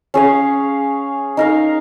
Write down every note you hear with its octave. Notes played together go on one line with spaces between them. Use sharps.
C#4 G#4 C#5 F5
D#4 A#4 F5